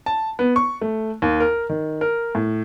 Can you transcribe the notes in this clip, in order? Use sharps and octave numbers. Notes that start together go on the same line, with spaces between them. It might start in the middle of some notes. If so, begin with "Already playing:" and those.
A5
B3
C#6
A3
D#2
A#4
D#3
A#4
A2